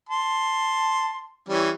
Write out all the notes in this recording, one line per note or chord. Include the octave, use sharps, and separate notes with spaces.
A5 C6
E3 G3 C#4